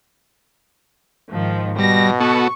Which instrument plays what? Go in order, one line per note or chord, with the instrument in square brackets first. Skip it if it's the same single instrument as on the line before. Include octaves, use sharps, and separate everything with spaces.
[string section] G#2 D#3 F3
[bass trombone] B2 [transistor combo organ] G3 [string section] A#6
[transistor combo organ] B3 F#4 A4 [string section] C#6